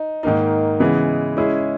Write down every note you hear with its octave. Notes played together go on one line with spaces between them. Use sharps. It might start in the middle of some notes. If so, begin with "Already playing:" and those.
Already playing: D#4
G#2 D#3 A#3 D#4
C#3 E3 G#3 B3
G#3 C#4 E4 G#4